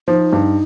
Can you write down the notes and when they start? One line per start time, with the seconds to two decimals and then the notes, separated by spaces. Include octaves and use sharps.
0.08 F3 D#4
0.33 G2